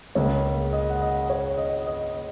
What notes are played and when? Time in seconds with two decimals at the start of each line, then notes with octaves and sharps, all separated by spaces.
0.15 C#2 C#3 A#3 C#5
0.73 D#5
0.90 F#5
1.02 D#5
1.30 C#5
1.58 D#5
1.87 D#5
2.15 D#5